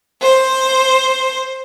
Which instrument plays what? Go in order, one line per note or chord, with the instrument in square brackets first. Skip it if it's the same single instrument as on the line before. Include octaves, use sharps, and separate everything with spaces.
[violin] C5